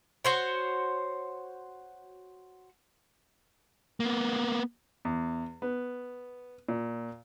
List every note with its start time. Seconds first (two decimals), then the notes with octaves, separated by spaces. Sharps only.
0.25 F#4 C5 C#5
4.00 A#3 B3
5.05 E2
5.62 B3
6.69 A#2